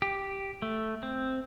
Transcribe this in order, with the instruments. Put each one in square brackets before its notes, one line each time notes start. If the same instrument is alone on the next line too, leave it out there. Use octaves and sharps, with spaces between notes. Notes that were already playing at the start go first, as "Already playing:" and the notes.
[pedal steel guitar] G4
A3
C4